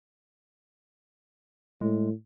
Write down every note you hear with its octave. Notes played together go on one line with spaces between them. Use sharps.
A2 G#3